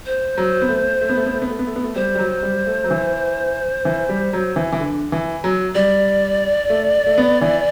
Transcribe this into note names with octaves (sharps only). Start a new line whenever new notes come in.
C5
F#3
B3
A3
A3
B3
A3
B3
A3
B3
A3
B3
A3
B3
A3
G3 C5
G3
F#3
G3
A3
F#3
E3
E3
G3
F#3
E3
E3
D3
E3
F#3
G3 D5
A3
A3
B3
E3